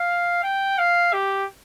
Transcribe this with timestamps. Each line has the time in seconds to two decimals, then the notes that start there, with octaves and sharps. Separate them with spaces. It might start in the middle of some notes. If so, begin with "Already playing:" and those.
Already playing: F5
0.43 G5
0.78 F5
1.13 G4